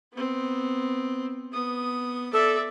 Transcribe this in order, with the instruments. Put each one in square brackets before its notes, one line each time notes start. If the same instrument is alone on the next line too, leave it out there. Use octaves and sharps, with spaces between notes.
[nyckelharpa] B3 C4
B3 D#6
[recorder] A4 [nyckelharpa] D5 E5